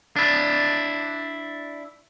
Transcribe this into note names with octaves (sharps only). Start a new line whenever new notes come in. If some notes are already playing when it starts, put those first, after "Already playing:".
D4 E4